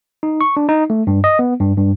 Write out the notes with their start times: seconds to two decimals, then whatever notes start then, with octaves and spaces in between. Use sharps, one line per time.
0.23 D#4
0.41 C#6
0.57 D4
0.69 D#4
0.90 A3
1.07 G2
1.24 D#5
1.39 B3
1.60 G2
1.77 G2